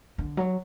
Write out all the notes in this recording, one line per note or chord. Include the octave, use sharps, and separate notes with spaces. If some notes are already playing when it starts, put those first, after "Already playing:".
D3
F#3